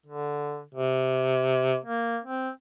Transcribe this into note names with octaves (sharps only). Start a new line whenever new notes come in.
D3
C3
A#3
C4